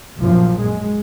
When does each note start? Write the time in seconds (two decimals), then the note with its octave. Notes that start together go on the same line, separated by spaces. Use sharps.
0.20 A#1 F#2 A#2 F3
0.61 G#3